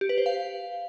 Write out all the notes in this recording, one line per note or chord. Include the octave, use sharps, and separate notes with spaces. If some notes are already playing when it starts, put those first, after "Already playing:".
G4
B4
C5
F5